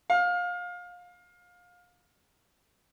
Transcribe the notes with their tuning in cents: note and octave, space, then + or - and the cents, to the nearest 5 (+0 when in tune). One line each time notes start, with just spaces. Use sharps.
F5 +25